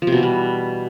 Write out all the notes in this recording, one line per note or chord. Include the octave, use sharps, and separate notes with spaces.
F3
C3
B2
E3
G3